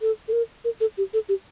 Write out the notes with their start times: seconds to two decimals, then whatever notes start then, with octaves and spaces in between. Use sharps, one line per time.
0.01 A4
0.28 A4
0.33 A#4
0.65 A#4
0.80 A4
0.98 G4
1.13 A4
1.29 G4